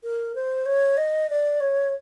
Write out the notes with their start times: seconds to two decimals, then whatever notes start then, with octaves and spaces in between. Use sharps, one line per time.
0.04 A#4
0.35 C5
0.66 C#5
0.97 D#5
1.30 D5
1.60 C#5